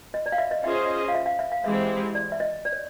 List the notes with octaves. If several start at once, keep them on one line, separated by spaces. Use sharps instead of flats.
D#5
D5
F5
E5
D#5
C#4 F4 G#4 C5 D#5 E5
F5
E5
F5
E5
F5
E3 G#3 C4 E4 G4 E5
D5
E5
D#5
D5
C#5